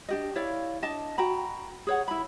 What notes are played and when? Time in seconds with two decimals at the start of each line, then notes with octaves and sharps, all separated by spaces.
0.09 D4 G4 D#5
0.36 E4 C#5 D5 F5
0.82 D4 D#5 A5
1.18 F#4 G5 A#5 B5
1.87 G#4 C#5 F#5
2.08 E4 B5